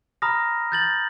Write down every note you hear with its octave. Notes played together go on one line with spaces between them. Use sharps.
A#5 B5 D#6 F6 A#6
G6 A6 F#7